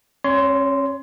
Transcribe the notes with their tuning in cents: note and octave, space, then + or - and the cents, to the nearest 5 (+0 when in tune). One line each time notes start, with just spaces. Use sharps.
C#4 -30 C#5 +25 C6 -10